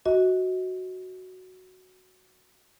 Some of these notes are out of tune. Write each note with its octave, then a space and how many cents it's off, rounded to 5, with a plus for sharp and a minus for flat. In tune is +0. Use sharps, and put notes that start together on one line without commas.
F#4 +0 D#5 +30